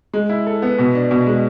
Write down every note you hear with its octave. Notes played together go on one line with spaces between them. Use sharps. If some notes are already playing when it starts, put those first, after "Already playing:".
G#3
E4
A4
B3
B2
D4
B2
G#3